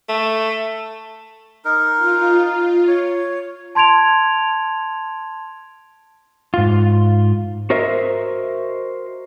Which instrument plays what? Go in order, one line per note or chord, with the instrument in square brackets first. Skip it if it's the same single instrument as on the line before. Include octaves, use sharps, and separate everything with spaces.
[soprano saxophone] A3
[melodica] D#4 A#4
[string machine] F4
[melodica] C#5
[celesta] A5 C6 G#6 D7 F7
[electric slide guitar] G#2 F4
F#4 A#4 C5 D#5 E5